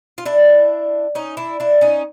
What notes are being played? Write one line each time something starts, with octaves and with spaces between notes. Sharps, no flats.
F4
D4 E4
C#4 D#4
D4 E4
D4 E4
C#4 D#4